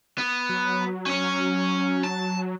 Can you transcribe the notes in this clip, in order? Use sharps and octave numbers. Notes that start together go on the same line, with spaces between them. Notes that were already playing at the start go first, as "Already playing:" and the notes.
B3
F#3
C#4 C#5
A5